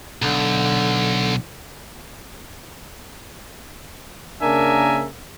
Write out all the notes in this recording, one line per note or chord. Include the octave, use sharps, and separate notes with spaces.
B1 D3
C#3 A#3 D4 A#4 E5 G#5